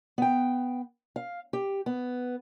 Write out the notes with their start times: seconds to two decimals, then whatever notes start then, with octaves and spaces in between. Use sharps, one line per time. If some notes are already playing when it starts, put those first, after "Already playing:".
0.18 B3 G5
1.16 F5
1.53 G4
1.86 B3